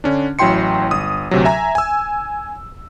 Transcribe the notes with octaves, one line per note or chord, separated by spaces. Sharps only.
D3 C#4 D4
A1 F#3 E4 G5 C6 C#7
G1 D#6
D2 C3 F#3
E5 G#5 A#5
G#5 E6